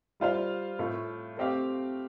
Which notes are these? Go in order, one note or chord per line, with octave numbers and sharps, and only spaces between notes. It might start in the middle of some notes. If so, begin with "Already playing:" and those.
G3 F4 C5 F5
A2 A3 F4
A3 C4 G4 F5